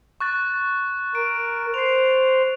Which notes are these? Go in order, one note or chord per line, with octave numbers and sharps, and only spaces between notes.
C#6 F#6 A6
A#4 D7
C5 C7 F7